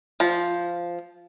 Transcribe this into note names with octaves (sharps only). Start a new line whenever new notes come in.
F3